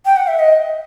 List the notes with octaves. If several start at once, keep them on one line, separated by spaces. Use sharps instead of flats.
G5
F#5
E5
D#5